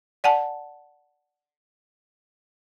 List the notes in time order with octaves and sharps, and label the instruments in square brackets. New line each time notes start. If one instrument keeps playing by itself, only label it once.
[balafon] D5 F#5 G#5 A5